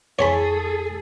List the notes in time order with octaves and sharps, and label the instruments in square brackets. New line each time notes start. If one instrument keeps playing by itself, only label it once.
[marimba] F2 G#5 C#6 [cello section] G#4 A4 [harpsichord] C#5 A5 B5